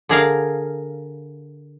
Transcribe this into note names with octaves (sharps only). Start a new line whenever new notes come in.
D3 G#4 A#4 F5